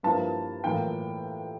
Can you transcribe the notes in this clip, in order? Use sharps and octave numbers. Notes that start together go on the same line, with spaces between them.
G2 F3 A#3 E4 A5
A2 E3 A#3 F4 G5